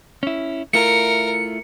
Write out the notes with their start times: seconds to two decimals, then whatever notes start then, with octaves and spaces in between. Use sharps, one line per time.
0.23 C#4 E4
0.73 A3 E4 F4 A#4 C#7